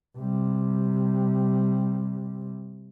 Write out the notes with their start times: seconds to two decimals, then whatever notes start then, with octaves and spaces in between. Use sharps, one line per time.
0.18 C3 G3